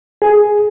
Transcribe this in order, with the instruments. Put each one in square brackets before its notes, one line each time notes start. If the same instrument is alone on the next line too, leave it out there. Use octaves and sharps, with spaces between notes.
[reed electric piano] G#4